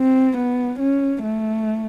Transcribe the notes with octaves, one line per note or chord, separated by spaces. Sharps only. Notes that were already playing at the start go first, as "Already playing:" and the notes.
Already playing: C4
B3
C#4
A3